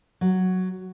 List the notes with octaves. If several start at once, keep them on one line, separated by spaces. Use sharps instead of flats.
F#3